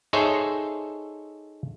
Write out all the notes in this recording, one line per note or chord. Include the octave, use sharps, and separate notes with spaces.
D#4 G#4 A4 C5 C#5 E5